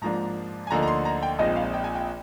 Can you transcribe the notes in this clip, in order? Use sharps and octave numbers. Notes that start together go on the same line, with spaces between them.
G#2 F3 A#3 D4 A#5
G#5
D2 D3 F3 A#3 D#4 A#5
A#5
C6
A#5
G5
A#1 A#2 G#3 C4 D#4 D#5
F5
G5
G#5
G5